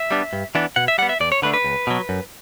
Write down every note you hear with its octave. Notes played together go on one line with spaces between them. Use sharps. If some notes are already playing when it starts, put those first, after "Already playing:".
Already playing: E5
G3 B3 D4
G2
E3 B3 D4
B2 F#5
E5
G3 B3 F#5
E5
E2 D5
C#5
D3 A3 D4 B4
B4
C#2
B2 F#3
F#2